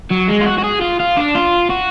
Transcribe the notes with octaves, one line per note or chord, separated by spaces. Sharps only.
F#3
G#3
F4
F#4
F#4
G#4
F4
F4
D4
F4
F#4